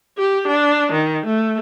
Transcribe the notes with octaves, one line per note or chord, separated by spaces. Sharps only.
G4
D4
D#3
A3